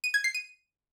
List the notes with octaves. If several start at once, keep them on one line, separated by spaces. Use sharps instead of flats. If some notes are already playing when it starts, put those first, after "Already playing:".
D#7
G#6
C7
D#7